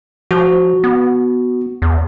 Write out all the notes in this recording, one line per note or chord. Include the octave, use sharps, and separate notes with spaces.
F3 F#4
B3
E2